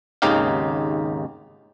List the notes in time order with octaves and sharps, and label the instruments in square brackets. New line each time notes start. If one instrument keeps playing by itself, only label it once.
[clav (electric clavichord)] G#1 D#2 C#3 D#4 G4 F5